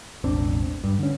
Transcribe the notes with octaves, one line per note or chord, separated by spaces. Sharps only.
E1 A1 C4 D4
G2
D3 C#4